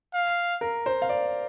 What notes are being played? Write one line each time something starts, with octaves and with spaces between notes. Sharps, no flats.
F5
A#4
C5
F5
D5